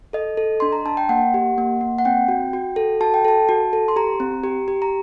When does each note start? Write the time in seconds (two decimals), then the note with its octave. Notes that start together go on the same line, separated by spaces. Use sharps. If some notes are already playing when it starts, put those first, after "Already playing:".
0.13 A4 D#5
0.37 A4
0.60 D4 C6
0.72 A#5
0.86 D4 A5
0.97 G5
1.09 A#3 F#5
1.34 G4
1.58 A#3
1.81 A#3
1.98 F#5
2.05 C4 G5
2.28 F#4
2.53 F#4
2.76 A4
3.01 F#4 A5
3.14 G5
3.25 A4 A5
3.49 F#4
3.73 A4
3.88 C6
3.96 G4 A#5
4.20 C4
4.44 G4
4.68 G4
4.82 A#5